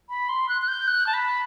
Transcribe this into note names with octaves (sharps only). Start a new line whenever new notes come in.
B5
C6
F#6
F#6
G6
F#6
A5
B5